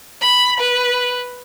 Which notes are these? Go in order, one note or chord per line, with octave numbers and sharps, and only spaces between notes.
B5
B4